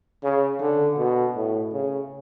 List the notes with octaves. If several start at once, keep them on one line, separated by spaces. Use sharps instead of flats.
C#3
D3
B2
A2
C#3